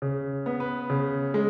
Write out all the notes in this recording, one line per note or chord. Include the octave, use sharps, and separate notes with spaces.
C#3
B3
B4
C#3
G#3